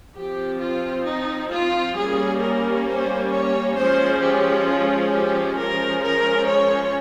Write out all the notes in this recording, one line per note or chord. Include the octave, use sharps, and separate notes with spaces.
F3 C4 G4
F4
D#4
F4
G3 A#3 C#4 G#4
A#4
C5
C#5
F3 G#3 C#4 C5
G4
F4
G4
F3 G#3 C#4 A#4
A#4
C#5